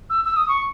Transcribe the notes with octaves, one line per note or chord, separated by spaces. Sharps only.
E6
E6
D#6
C#6